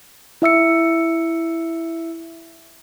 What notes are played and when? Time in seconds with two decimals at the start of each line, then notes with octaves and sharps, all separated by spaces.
0.42 E4 E5 E6 C#7